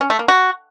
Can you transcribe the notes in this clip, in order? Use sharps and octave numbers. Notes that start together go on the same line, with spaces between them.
C#4
A3
A#3
F#4